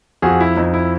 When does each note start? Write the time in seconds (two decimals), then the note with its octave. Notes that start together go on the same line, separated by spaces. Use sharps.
0.22 F2 F#4 G#4
0.40 E4
0.57 F2 D#4
0.74 E4